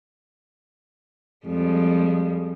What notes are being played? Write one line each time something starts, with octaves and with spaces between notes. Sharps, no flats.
F2 G3 G#3